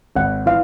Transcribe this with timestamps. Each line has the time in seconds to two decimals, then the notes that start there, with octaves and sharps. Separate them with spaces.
0.16 G#1 F#5
0.46 E3 F5